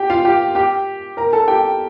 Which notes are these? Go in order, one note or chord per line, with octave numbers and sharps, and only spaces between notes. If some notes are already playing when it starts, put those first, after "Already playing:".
Already playing: G4 G5
F4 F5
G4 G5
G4 G5
A#4 A#5
A4 A5
G4 G5